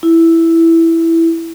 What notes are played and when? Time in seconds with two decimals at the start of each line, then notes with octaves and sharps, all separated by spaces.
0.03 E4